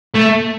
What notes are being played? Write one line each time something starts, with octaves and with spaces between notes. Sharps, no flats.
A3